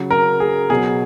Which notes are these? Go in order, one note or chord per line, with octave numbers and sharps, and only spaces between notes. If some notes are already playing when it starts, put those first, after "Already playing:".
Already playing: C#3 F#3
A#4
G#4
B2 F#3 G#4